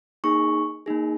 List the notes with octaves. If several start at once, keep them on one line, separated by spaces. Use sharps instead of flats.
A#3 D#4 G#4 C#6
A#3 D#4 G#4